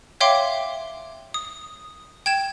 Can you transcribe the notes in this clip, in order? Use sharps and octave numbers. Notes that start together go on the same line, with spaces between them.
C#5 E5 F5 G5 C6 D6
D#6
G5 G#6 E7